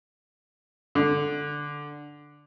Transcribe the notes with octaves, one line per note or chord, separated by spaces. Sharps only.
D3